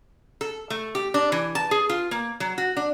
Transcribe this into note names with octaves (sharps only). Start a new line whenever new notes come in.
A4
A3
G4
D4
E3
A5
G#4
F4
A#3
F#3
F#4
D4